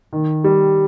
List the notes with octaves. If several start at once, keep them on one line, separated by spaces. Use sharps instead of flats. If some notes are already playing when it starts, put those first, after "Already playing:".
D#3
G3